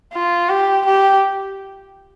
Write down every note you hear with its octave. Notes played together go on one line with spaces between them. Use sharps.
F4
G4
G4